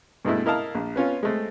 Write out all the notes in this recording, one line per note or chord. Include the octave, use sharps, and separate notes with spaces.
G2 B2 G#3 A3 E4
E4 A#4 D#5 F5 A5 A#5
A#1
B3 C#4 F4
G#3 A3 C4